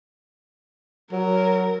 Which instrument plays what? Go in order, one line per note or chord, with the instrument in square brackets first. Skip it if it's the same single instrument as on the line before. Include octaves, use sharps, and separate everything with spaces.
[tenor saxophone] F#3 [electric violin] A#4